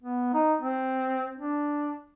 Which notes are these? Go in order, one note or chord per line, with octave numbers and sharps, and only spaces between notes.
B3
D#4
C4
D4